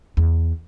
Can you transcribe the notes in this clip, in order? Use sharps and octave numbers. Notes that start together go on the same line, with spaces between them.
E2